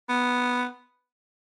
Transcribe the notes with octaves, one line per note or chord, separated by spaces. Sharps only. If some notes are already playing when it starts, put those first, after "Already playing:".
B3